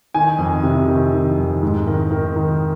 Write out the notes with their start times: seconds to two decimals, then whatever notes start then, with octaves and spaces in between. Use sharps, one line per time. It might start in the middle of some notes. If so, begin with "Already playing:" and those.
0.14 D#3 G#5
0.38 F2
0.63 C3
0.88 D#3
1.13 D#3
1.37 F2
1.63 G#2
1.86 D#3 A#4
2.11 D#3 A#4
2.36 D#3